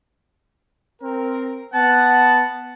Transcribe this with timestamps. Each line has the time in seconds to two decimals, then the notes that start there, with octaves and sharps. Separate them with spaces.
1.02 C4 A#4
1.74 B3 F#5 A5